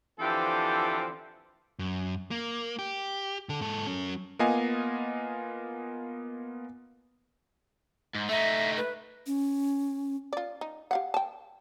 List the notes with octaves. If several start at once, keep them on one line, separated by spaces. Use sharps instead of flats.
D3 E3 F3 C4 G4 A4
F#2
A#3
G4
D3 A4
G#2 A4
F#3 C#4
A#3 B3 F4 D#5 F5 G#5
G#2
A3 D#4 E5
B4
C#4
F4 D5
D#4
G4 F5 F#5
G5 A5